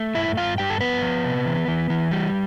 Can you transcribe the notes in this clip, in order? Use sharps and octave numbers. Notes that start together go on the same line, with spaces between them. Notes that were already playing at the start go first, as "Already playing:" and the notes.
Already playing: A3
G2 E4 E5
G2 F4 F5
G2 G4 G5
A4
F3 B3 B4
F3
C3
E3
E3
E3
G3